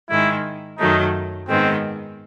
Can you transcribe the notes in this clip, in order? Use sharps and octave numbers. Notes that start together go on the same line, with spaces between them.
G#2 D#3 G#3 E4
F#2 D#3 F#3 A3 D#4
G#2 D#3 G#3 B3 C4